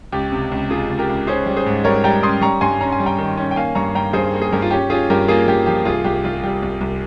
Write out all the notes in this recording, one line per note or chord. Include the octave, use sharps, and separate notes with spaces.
C#2 G4
C3
C#2
C3 F4 G#4
C#2
G4 A#4
C#2
C#4 G#4 C5
G3
G#4 C5
G#2
G3 A#4 C#5
G3 G5 A#5
C#4 C6 D#6
G3 A#5 C#6
G2 G#5 C6
C#4 A#5
G#5
G3
G5 A#5
D#3
C#4
G5
A#3 F5 G#5
G2 A#5 C#6
G2 G5 A#5
G2 G#4 C5
A#3
G#4
G2 G4 A#4
F4
C#4 G4
C#4 F4 G#4
G2 G4 A#4
A#3 F4 G#4
G2 G4
F3 G4
C2 F4 G#4
C2 G4
C2 F4
G3 G4
C2
C2